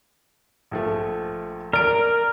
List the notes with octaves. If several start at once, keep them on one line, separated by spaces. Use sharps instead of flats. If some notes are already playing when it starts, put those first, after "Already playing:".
A#1 F3 A3
A#4 D5 D7